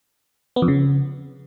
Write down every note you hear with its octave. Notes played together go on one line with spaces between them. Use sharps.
B3
F2
C#3